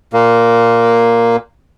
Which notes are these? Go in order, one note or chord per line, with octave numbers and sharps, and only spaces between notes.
A#2 A#3